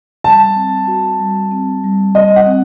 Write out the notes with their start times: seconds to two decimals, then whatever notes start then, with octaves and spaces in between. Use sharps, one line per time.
0.24 G3 A5
0.56 C4
0.88 F#4
1.20 G3
1.52 C4
1.84 G3
2.15 G3 D#5
2.36 F#5
2.47 C4